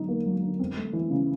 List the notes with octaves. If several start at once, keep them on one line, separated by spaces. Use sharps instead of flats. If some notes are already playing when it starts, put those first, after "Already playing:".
Already playing: D3 F#3 D#4
A#3
F#3
D3
C4
A3
E3
C#3